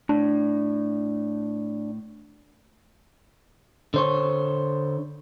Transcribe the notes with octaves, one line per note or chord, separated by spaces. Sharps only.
A2 D4
D3 C5 C#5